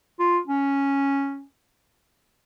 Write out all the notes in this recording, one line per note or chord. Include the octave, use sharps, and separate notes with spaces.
F4
C#4